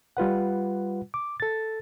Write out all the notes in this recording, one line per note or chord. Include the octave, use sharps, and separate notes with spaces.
G3 F4 B4 F#5
D6
A4 A6